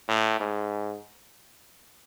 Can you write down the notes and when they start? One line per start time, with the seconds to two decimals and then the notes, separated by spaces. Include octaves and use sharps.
0.09 A2
0.40 G#2